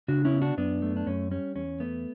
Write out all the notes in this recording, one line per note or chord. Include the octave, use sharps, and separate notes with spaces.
C#3 D4 F#4
C#4 E4
B3
D4 F#4
F#2 B3 D4
A3
D4
F#2 C#4
G3 C#4
E2 C#4
A3 B3